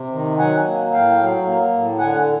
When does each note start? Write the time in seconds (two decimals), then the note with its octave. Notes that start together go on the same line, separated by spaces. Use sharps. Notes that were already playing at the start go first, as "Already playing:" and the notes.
Already playing: C3
0.12 D#3
0.38 F#3 F#5 G#5
0.65 A#3
0.93 A2 F5 G5
1.19 F#3
1.45 A#3
1.73 A2
1.99 D3 F#5 G#5